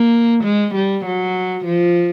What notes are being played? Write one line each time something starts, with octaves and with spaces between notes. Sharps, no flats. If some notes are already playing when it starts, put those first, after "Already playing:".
Already playing: A#3
G#3
G3
F#3
F3